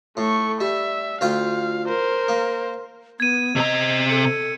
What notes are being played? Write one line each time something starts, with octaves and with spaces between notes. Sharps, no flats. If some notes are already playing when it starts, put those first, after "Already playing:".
A2 A3 C#6
G3 E5
D2 F4 F5 G5
A#4 C5
A#3
B3 G#6 D#7
C3 D#5 A#5
A4 C#7